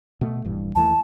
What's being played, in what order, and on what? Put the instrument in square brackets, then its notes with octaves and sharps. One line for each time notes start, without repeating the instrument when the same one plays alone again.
[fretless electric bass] B2 A3
D#1 G2 E3
[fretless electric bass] D#2 E3 A3 [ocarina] A5